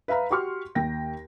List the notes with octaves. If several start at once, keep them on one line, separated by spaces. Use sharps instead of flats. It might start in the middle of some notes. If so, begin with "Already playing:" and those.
B4 E5 F5 A#5 B5
F#4 G4 C6 C#6 F6
D#2 G5 A#6